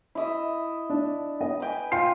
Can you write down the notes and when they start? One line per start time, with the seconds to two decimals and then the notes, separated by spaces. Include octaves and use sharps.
0.15 E4 D#5 E5
0.90 D4
1.41 D#5
1.60 B4 G5 G#5
1.92 F4 G5 C7